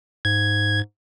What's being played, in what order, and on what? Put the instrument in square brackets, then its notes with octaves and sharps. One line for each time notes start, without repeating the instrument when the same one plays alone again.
[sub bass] G#2 [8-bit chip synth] G#6